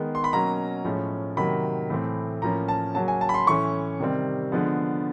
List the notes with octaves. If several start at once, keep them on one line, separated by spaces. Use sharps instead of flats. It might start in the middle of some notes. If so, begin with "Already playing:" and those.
Already playing: D#3 G#3 B3
C6
B5
B2 F#3 A#3 C#4 A#5
A2 F3 G#3 C#4
C3 D#3 F#3 A#3 B5
A2 E3 A3 C4
A2 F3 A#3 C#4 A#5
A5
C#3 F#3 A#3 C#4 A5
G#5
A5
B5
C6
A2 E3 A3 C#4 C#6
C3 D#3 G3 C4
D3 F3 G#3 B3